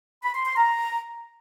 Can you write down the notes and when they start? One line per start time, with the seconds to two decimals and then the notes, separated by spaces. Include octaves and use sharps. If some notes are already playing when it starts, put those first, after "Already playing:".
0.24 B5
0.35 C6
0.46 C6
0.57 A#5